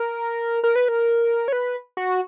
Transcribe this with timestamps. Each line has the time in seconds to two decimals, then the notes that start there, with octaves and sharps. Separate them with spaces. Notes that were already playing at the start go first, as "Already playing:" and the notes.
Already playing: A#4
0.64 A#4
0.76 B4
0.88 A#4
1.48 C#5
1.52 B4
1.97 F#4